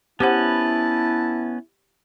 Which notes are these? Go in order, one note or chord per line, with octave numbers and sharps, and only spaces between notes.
B3 C#4 E4 G4 B4 C5 F#5 A5